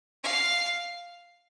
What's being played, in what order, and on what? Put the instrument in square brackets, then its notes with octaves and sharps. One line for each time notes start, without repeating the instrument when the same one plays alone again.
[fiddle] F5